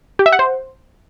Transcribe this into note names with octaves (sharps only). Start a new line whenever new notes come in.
G4
E5
F#5
C5